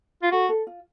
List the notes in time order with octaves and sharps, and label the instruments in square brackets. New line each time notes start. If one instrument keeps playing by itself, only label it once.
[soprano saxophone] F4
[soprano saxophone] F#4 [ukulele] A4
[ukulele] A4
F4